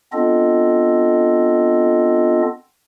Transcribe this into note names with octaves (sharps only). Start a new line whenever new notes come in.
B3 C4 D4 F4 A4 D#5